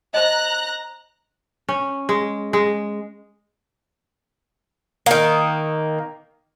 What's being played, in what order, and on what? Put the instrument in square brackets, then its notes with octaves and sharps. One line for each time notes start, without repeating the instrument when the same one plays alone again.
[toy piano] C5 D#5 [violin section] A#5 F#6
[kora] C#4
G#3
G#3
[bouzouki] D#3 A#3